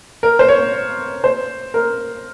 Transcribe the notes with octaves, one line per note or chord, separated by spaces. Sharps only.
A#4
C5
C#5
C5
A#4